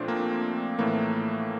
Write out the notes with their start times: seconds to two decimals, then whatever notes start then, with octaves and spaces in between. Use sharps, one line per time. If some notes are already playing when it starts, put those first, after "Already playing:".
Already playing: A#2 F3 A3 C4 D4
0.08 A#3
0.79 A2 E3 A3 A#3